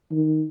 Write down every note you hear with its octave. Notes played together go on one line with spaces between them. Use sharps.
D#3